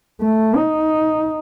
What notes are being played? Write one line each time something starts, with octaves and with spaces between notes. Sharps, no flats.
A3
D#4